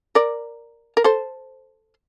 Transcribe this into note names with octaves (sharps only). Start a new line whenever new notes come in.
A#4 D5
A#4
A4 C5